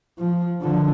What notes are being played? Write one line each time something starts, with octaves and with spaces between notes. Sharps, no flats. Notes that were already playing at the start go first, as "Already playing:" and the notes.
F3
D3 F3